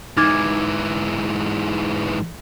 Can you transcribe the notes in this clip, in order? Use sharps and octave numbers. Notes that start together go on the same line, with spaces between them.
G#2 E3 D#4 D6 G#6